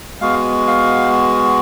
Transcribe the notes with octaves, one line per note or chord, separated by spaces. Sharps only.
G#3 B3 F#4 F5
F5